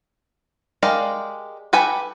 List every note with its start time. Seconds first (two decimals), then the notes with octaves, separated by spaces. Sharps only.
0.83 G#3 G4 A#4 D5 F5
1.73 G4 A4 B4 G#5 B5